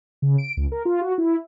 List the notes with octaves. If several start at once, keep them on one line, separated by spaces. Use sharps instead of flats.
C#3
D7
C#2
A#4
F4
F#4
E4